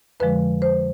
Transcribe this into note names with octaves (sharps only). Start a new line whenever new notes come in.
F2 D3 F3 G#3 B4
C5